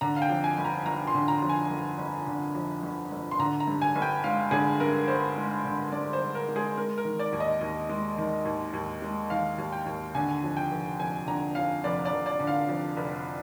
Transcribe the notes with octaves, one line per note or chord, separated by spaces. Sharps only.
D3 A#5
F5
G5
F2
G#5
G1
A#5
G1 A#5
C6
D3
A#5
F2
G#5
G1
G1
D3
F2
G1
G1
C6
D3 A#5
A#5
G2
G#5
G1
G5
G#3 F5
D3 G#4
G2 A#4
G1 C5
G#3
D3
G2 D5
C5
G1
A#4
G#3
G#4
G#3 A#4
A#4
D#3
D5
D#2
D#5
D#2
G#3
D#3
D#2
D#2
G#3
D#3 F5
D#2
G5
D#2
D3 G#5
F2
G5
F1
F1 G#5
D3 A#5
F2 F5
F1 D5
D5
F1
D5
D3
F5
F2
F1